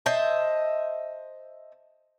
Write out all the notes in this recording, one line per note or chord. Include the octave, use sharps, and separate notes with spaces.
C5 D#5 E5 A5